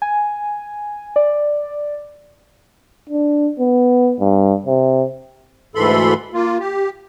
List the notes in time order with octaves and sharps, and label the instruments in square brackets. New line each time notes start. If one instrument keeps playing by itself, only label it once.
[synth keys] G#5
D5
[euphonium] D4
B3
G2
C3
[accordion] D2 G#2 E3 A4 B5 C6
A#3 F4
G4